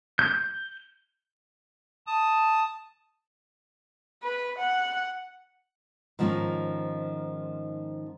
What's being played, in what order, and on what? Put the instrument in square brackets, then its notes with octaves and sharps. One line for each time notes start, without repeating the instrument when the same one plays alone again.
[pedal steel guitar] G6
[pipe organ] A5 D#6
[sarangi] B4
F#5
[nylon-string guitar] G#2 D#3 F3 B3 C#4 D#4